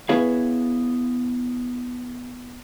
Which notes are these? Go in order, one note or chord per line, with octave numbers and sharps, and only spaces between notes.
B3 E4 G#4 C#5 F5